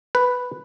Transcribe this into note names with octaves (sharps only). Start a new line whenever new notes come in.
B4